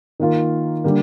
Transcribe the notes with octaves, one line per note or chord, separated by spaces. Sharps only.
D#3 A#3 F4
D3 G3 A#3